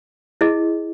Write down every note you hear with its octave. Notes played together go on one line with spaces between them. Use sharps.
E4 G#4 D#5